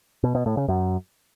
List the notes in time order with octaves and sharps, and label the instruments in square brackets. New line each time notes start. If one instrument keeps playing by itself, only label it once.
[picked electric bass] B2
B2
A2
C#3
F#2